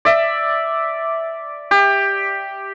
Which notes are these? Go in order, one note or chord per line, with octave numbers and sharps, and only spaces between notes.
D5 E5
G4